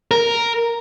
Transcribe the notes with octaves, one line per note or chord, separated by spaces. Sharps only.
A#4